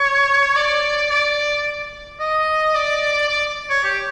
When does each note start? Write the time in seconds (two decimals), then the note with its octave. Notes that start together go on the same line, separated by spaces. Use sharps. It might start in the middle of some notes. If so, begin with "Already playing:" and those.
Already playing: C#5
0.56 D5
1.11 D5
2.20 D#5
2.74 D5
3.29 D5
3.70 C#5
3.84 G4